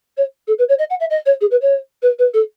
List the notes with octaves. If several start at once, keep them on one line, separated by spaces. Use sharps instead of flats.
C#5
A4
B4
C#5
D#5
F#5
E5
D#5
C#5
G#4
B4
C#5
B4
B4
A4